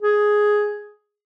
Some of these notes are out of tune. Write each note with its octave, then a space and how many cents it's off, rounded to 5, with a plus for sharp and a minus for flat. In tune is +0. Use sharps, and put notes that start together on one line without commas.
G#4 +5